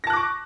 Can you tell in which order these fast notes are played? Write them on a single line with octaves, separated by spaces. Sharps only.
A#6 A5 F#6 D6 C#6